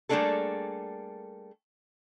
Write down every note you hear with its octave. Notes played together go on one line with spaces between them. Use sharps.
G3 A3 A#3 D4 G#4 A4